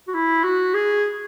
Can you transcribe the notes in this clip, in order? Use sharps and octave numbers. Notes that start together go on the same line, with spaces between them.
F#4
E4
F#4
G#4